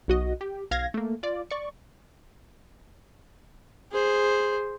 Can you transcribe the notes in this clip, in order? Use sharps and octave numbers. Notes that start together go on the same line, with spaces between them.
B1 F#4 D#5
G4
B1 F5 G#6 A#6
A3 A#3
F4 D5
D5 C#6
G#4 C5